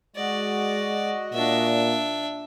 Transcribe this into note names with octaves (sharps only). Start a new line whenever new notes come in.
G#3 F#4 D5 D#5
A#2 D4 E5